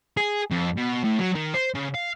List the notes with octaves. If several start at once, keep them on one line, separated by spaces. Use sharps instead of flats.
G#4
F2
B2
A2
F#3
D#3
C5
C#3
F5